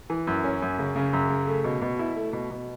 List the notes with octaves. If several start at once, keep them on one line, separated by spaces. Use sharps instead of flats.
E3
F#2
C#4
F#2
C#3
C#3
F#2
C#3
A3
B2
B2
E4
A3
B2
B2